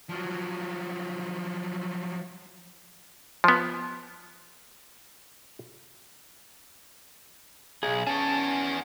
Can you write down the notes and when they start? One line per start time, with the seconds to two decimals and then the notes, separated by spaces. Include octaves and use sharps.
0.09 F3 F#3
3.44 F3 B3
7.83 B1 G#4
8.07 B3 C#4 G#4 A5